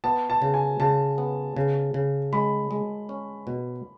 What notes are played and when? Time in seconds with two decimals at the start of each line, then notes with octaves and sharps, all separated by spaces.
0.04 B3 A5
0.30 A5
0.42 C#3
0.54 G#5
0.80 C#3 A5
1.18 B3
1.57 C#3
1.94 C#3
2.33 G#3 B5
2.71 G#3
3.09 C#4
3.47 B2